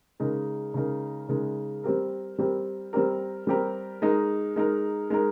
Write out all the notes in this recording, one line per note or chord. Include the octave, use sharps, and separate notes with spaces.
C#3 G#3 D#4 A#4
C#3 G#3 D#4 A#4
C#3 G#3 D#4 A#4
G3 C4 G4 A#4
G3 C4 G4 A#4
G3 C4 G4 A#4
G3 C4 G4 A#4
G#3 D#4 A#4
G#3 D#4 A#4
G#3 D#4 A#4